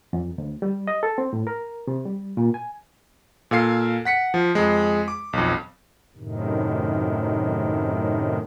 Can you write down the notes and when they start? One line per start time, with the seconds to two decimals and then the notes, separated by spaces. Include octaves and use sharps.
0.13 F2
0.38 D2
0.62 G3
0.88 D#5
1.03 A4
1.18 C4
1.33 A2
1.47 A#4
1.87 C3
2.05 G3
2.37 A#2
2.54 G#5
3.51 A#2 A4 F5 C7
4.05 F#5 B6 C#7
4.34 F3
4.55 F2 G#3
5.08 D6
5.33 B1 F2
6.16 F#2 A2 C3 D#3